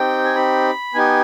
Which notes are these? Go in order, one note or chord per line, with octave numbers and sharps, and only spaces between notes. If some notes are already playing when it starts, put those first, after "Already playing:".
Already playing: C4 D#4 G4 G5
G#5
B5
B3 D#4 G4 G#5